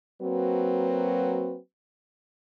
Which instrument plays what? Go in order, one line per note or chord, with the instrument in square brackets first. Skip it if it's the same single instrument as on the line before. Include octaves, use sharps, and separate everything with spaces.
[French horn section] F#3 A#3 C4 F#4 B4